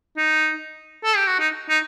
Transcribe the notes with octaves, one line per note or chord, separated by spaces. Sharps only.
D#4
A4
G4
F#4
D#4
D#4